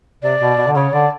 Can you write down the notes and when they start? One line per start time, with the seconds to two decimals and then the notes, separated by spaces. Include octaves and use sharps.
0.23 C3 D5
0.40 B2
0.58 B2
0.68 D3
0.75 C#3 C#5
0.93 D3 D5